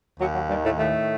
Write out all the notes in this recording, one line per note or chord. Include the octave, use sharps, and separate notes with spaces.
D#2 F#3
F#3
G2 D#3 G3
A2 A3
A2 D#3 A3